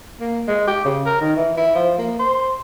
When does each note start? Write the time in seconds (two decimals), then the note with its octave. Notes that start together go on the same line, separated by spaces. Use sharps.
0.20 A#3
0.48 G#3
0.67 G4
0.85 C#3
1.06 A#4
1.21 D#3
1.36 E3
1.57 E4
1.75 F3
1.98 A#3
2.19 C5